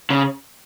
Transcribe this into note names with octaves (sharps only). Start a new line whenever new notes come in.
C#3